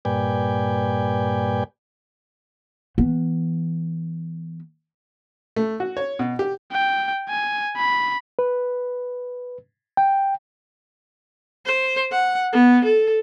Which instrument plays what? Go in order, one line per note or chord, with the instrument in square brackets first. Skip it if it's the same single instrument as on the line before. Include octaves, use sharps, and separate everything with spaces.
[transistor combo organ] G2 A#2 B4 D5 G5 G#5
[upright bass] E3 B3
[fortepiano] A3
F#4
C#5
B2
G4
[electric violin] G5
G#5
B5
[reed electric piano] B4
G5
[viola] C5
F#5
B3
A4